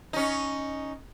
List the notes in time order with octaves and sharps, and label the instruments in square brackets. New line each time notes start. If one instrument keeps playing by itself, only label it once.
[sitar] C#4 D#4